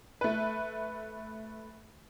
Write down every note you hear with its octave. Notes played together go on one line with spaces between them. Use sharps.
A3 B4